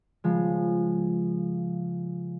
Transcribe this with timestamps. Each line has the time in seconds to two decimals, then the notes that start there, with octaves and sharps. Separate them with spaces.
0.24 C#3 F3 G#3